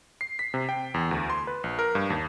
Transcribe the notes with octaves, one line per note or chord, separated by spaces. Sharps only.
C7
B6
C3
G5
E2
D2
C6
B4
A#1
A#4
G2
D#2